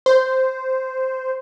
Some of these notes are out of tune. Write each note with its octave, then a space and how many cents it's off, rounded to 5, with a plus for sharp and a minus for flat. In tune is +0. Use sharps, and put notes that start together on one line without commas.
C5 -5